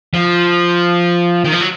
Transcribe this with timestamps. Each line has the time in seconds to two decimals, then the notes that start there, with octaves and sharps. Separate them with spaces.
0.14 F3
1.45 D#3
1.52 F3
1.61 F#3